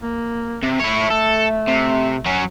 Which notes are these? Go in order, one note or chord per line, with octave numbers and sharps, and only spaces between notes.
A#3
C3
A3 E4 C#5
A4
C3
F#3 C#4